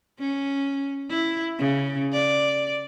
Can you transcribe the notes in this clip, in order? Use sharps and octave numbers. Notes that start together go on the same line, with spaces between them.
C#4
E4
C#3
D5